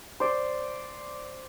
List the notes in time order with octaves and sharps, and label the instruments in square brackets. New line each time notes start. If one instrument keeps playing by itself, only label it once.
[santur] C5 D5